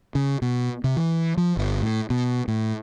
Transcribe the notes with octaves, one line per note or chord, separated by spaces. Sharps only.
C#3
B2
C3
E3
F3
G1
A2
B2
A2